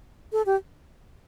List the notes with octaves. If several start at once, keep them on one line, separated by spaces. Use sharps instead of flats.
A4
G4